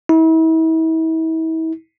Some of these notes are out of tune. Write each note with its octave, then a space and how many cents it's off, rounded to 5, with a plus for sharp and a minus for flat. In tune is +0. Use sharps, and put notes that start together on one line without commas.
E4 -40